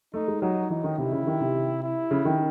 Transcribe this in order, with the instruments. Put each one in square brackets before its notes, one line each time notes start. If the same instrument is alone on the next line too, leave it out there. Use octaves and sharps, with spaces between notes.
[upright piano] A3 [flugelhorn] D#4
[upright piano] G#3
[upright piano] F#3 [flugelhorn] D#4
[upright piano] E3 [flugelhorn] D#4
[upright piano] D#3
[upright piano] C3 [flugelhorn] E4
[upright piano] C#3
D#3
C3
[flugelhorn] E4
[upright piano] C#3
D#3